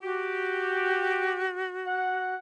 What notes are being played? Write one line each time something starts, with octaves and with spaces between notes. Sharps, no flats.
F#4 G4
F#5